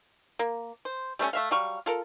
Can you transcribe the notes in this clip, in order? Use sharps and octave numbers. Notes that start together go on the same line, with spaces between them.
A#3
C5
G3 A3 C4 C#4
A3 E5 F5
F#3 G3 F5 C#6
F4 A4 A#4